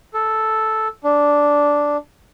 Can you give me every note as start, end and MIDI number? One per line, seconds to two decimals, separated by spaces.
0.14 0.88 69
1.04 1.97 62